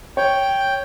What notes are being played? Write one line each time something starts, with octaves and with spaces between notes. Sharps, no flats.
C#5 G5